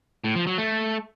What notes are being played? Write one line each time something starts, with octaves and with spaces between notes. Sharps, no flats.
A2
F3
F#3
A3